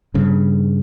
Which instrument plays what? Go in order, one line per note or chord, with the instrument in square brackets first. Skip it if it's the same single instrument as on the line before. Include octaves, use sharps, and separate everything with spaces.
[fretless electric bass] G2 C#3